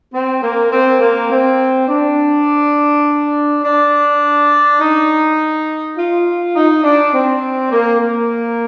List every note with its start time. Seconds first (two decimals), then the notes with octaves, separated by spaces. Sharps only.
0.13 C4
0.42 A#3
0.71 C4
1.00 A#3
1.30 C4
1.88 D4
3.63 D4
4.80 D#4
5.96 F4
6.55 D#4
6.83 D4
7.13 C4
7.71 A#3
8.00 A#3